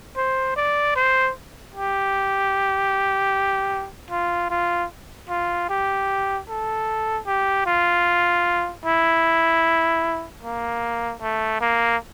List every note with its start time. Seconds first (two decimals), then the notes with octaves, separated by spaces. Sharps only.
0.17 C5
0.56 D5
0.96 C5
1.75 G4
4.11 F4
4.50 F4
5.29 F4
5.70 G4
6.49 A4
7.27 G4
7.66 F4
8.86 E4
10.43 A#3
11.22 A3
11.61 A#3